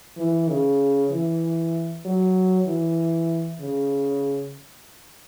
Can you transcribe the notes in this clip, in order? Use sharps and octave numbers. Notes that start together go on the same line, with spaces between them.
E3
C#3
E3
F#3
E3
C#3